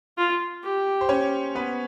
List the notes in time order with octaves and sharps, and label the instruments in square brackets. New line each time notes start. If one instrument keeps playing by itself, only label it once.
[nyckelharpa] F4
G4
[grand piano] C5
C#4 C#5
B3 B4